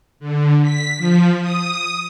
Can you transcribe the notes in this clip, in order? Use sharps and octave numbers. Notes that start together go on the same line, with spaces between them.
D3
B6
F3
D#6